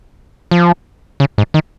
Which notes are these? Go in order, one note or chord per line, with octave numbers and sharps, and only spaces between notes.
F3
C#3
G#2
D#3